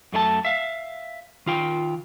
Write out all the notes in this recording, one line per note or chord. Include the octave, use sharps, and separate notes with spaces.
F#2 A3 D4 A5
E5 F5
D#3 F4 G5